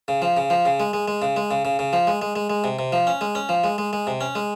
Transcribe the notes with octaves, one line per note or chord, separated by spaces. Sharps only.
C#3
F3
C#3
F3
C#3
G#3
G#3
G#3
C#3
G#3
C#3
C#3
C#3
F3
G#3
G#3
G#3
G#3
C3
C3
F3
C#4
G#3
C#4
F3
G#3
G#3
G#3
C3
C#4
G#3